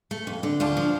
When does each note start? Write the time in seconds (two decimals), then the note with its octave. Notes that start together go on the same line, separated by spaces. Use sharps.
0.11 A3
0.27 F2
0.43 D3
0.60 D2 D4 F4
0.77 F3